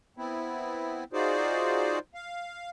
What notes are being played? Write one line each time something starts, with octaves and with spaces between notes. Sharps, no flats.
B3 C4 E4
D#4 F4 F#4 G#4 C5 D5
F5